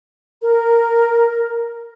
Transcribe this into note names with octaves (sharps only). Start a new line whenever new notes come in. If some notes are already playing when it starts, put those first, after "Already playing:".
A#4